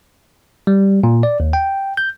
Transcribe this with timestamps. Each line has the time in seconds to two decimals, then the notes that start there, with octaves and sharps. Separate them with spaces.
0.67 G3
1.04 A#2
1.23 D5
1.40 D#2
1.53 G5
1.97 G6